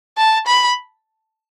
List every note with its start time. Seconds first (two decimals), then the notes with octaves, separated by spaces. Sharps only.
0.18 A5
0.47 B5